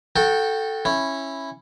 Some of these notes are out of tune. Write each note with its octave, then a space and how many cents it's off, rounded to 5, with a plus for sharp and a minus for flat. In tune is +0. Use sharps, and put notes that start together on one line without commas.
F#4 -20 A4 +0 G5 +0
C#4 -15 E4 +0